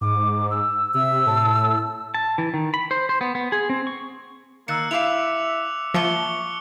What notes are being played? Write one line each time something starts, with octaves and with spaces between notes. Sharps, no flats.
G#2 D6
E6
C3 E5 E6
A2 A5
A5
E3
D#3
B5
C5
C5
B3
B3
G#4
C4
C#6
D#3 A#3 E6 F#6 C#7
E4 G4 E5 F5 D6 F7
F3 A#3 E5 A5 C#6 C#7 G7